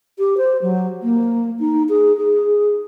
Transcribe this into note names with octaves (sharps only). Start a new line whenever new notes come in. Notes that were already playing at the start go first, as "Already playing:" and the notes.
G4
C5
F#3
A#3
D#4
G#4
G#4